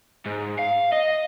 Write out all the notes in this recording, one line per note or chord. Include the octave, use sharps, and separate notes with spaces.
G#2
F5
D#5